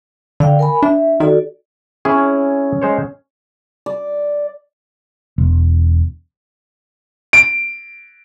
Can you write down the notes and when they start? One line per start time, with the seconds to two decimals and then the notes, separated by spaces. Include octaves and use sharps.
0.40 D3 D5 F5 G5
0.59 A#4 G#5 B5
0.83 D4 E5
1.20 D#3 F#4 A4 D5
2.05 C#4 E4 G#4
2.82 G#3 C5 C#5
3.86 D5
5.38 E1
7.33 D7